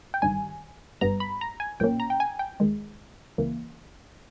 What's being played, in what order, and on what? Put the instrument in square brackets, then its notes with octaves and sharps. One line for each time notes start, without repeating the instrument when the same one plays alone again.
[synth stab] G5
G1 G2 D#3 G3 G#5
G1 G2 G3 B3 A#5
B5
A#5
G#5
B1 A#2 A#3 C#4 G5
A#5
G5
G#5
G5
D#2 D#3 G#3
C#2 C#3 E3 A#3